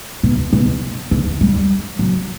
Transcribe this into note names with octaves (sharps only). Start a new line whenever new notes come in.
B2
B2
D3
G3
F#3